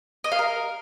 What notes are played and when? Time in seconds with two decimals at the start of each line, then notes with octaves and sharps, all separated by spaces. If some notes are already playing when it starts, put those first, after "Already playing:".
0.24 D#5
0.32 F5
0.39 A#4